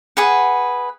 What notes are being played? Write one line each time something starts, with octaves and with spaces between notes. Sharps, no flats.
G#4 B4 F#5